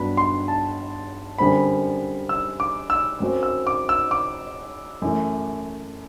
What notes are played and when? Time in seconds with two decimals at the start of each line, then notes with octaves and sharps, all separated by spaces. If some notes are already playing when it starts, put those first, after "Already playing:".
Already playing: G2 F#3 B3 D4 B5
0.17 C6
0.48 A5
1.38 F#2 D3 G3 C4 B5
2.29 E6
2.60 D6
2.90 E6
3.20 F#2 F#3 C4
3.43 E6
3.67 D6
3.89 E6
4.11 D6
5.02 F#2 E3 A3